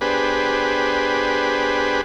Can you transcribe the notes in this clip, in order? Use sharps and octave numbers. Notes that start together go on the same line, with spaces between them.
B3 D4 G4 G#4 B4 C5